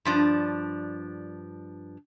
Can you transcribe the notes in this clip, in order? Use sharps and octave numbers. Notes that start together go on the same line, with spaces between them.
G2 F3 D4